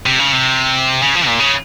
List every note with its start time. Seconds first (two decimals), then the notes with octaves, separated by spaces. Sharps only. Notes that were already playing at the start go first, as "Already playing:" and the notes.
0.06 C3
0.19 C#3
0.32 C3
1.02 C#3
1.15 F3
1.27 A#2
1.39 C#3